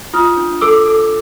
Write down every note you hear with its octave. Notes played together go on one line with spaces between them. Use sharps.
F4 D#6 F6
D4
A4 D6 E6
A4